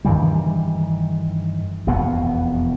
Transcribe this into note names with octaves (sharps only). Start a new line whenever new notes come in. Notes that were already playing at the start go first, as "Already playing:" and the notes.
G2 D#3 E3 G3
E1 F2 B2 B3